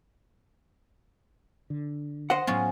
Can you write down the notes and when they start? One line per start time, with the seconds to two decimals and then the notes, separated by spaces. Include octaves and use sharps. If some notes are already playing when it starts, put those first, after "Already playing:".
1.70 D3
2.30 C5 D#5 F#5
2.47 A2 F#3 G#3 B3 C#4 F4